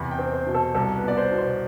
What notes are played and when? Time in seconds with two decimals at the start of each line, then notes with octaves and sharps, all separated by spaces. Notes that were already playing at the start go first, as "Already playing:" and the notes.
Already playing: E2 C3 B5
0.11 G5
0.19 C4
0.33 C5
0.47 B2
0.54 A4
0.75 C2 A4
0.96 B4
1.03 B3 D5
1.17 C5
1.31 B2
1.38 C5